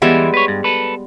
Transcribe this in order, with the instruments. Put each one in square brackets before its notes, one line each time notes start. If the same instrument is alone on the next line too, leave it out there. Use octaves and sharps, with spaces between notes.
[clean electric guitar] E2 E3 E5 [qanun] G3 G#3 B3
[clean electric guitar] B4 C#5
G2
A4 B4